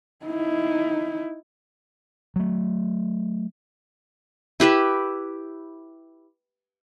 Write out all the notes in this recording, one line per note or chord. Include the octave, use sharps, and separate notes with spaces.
D#4 E4
F#3 A3
E4 G4 B4 E5